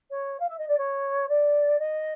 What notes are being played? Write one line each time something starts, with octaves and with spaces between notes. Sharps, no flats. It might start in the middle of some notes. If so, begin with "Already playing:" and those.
C#5
F5
E5
D#5
D5
C#5
D5
D#5